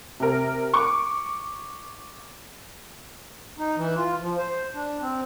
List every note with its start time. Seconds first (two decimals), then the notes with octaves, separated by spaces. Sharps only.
0.20 C3 A#4
0.74 C#6 D6
3.58 D#4
3.76 E3
3.96 F4
4.20 F3
4.38 C5
4.75 D4
5.01 C4